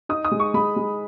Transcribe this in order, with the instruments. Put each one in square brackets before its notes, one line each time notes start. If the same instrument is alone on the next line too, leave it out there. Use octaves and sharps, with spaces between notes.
[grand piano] D#4 [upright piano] D#6
[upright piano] D#6
[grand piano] G#3
[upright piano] C#6
[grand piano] G#3 [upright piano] B5
[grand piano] G#3